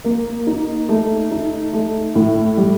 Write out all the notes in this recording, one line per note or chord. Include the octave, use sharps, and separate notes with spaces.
A#3
D#4
A3
D#4
A3
A2
G3